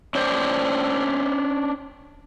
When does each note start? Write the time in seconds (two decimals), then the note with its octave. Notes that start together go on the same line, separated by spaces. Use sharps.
0.15 C#4 D4 C5 D5